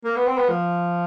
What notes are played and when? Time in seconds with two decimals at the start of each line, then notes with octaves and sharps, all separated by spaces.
0.05 A#3
0.16 B3
0.27 C4
0.38 B3
0.49 F3